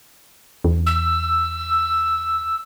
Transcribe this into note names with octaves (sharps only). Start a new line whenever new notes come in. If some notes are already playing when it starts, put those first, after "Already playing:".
E2
E6